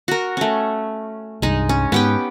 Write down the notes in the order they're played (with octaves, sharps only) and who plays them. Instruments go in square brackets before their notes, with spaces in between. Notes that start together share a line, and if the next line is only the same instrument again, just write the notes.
[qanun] F#4 A#4
A3 C#4
[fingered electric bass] C2 G2 [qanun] G#3 D#4
[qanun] C#4
[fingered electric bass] G#2 [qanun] B3 G4 G5